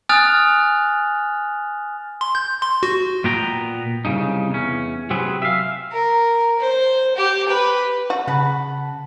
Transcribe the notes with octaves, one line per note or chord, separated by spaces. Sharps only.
G#5 D#6 F6 F#6 A6 F7
C6
G6
C6
F#4
A#2 B3 G5 A#5
C2 G#2 C#3 D#4
E2 C#4
C3 F#3 C4 G#4 B4
E5 F5
A#4
C5
G4
B4
F#4
C#3 F#5 A5 B5